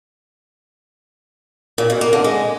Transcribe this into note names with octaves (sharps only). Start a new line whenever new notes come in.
A#2
B2
A#3
D3
G#3